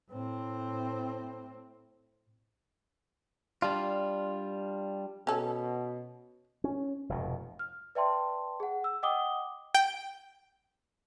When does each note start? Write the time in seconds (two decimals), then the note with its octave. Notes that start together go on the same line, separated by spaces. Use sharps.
0.10 A2 C4
3.62 G3 D4 F4
5.27 B2 C#4 A4
6.64 C#4
7.09 F1 F2 G#2 B2
7.59 F6
7.95 B4 D5 E5 G5 A5 C6
8.60 G#4 F#5
8.84 E6
9.03 D#5 F#5 G5 D6 D#6 G7
9.74 G5